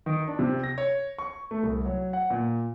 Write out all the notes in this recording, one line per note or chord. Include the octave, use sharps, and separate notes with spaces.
D#3
D4
C3
A#6
C#5
C#6
A3
C2
F#3
F#5
A#2